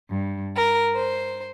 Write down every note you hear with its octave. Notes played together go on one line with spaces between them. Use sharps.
G2
A#4
C5